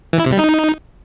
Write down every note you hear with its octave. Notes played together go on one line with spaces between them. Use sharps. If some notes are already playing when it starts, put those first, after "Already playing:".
E3
E4
C3
G3
D#4